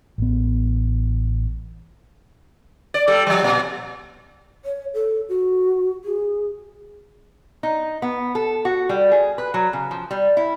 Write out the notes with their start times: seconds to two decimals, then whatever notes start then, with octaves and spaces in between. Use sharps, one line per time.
0.18 A1 B3
2.94 D5
3.07 G3 A4
3.27 F3 G3
3.44 A#2
4.65 C#5
4.94 A4
5.29 F#4
6.04 G#4
7.63 D#4
8.02 B3
8.35 A4
8.65 F#4
8.89 G3
9.12 G#4
9.38 B4
9.54 F#3
9.73 C#3
9.91 F3
10.11 G3
10.37 E4